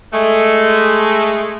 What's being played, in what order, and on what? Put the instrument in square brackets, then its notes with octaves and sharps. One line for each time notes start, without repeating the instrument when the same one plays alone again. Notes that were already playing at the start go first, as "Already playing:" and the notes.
[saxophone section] G#3 A3